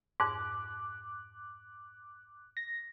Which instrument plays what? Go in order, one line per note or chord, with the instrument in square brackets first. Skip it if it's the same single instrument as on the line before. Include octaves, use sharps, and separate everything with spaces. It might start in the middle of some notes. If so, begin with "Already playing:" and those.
[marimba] F2 G#2 [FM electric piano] D6 F#6
[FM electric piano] A#6